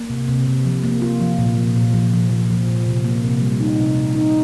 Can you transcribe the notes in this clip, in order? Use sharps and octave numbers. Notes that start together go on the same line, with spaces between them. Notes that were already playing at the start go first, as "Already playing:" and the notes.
Already playing: A#3
C3
C3
C3
F3
A#3
F4
F3
A#2
F3
A#2
F3
F3
F3
F3
A#2
C3
A#3
C3
G3
D#4
C3
C3
D#4